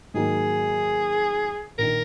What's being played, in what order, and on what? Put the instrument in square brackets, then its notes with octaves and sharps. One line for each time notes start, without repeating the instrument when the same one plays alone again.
[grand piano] G#2 D#3 F#3 A#3 [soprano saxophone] G#4
[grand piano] A#1 D#3 [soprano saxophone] A#4